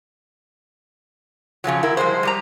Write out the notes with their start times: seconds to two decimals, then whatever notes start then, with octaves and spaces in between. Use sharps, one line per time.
1.64 F2 C#3 F3 F#3
1.83 E4 A#4
1.97 F3 G3 G#3 C5
2.23 G3 G4 A#5